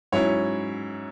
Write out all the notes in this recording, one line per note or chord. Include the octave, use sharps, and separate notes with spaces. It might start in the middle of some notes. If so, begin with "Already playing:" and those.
G#2 F#3 C#4 E4 C#5